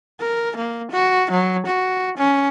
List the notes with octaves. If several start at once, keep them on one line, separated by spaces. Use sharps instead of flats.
A#4
A#3
F#4
F#3
F#4
C#4